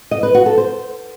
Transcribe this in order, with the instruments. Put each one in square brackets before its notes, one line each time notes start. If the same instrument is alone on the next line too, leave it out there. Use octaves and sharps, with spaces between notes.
[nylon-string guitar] D#5
B4
F#4
A4
C5